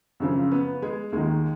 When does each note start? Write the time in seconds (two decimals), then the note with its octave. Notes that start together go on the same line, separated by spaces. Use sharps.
0.20 F#2 C#3 F3
0.51 B3
0.82 G#3
1.12 D#2 D#3 G#3